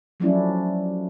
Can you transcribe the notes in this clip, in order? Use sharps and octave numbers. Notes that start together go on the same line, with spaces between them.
F3 F#3 A3 C#4 D4 E4